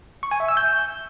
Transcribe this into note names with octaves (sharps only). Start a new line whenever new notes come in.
C#6
G#5
E5
E6
G6